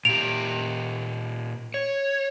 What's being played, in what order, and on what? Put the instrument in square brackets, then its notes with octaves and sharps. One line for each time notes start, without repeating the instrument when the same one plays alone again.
[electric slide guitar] A#2 G4 [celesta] D7 F7
[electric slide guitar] C#5